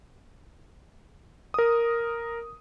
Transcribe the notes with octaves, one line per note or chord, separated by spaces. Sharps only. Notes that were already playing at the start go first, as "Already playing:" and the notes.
A#4 D#6